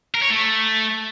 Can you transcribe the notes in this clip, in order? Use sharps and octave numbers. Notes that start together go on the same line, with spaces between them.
A#4
C#5
A3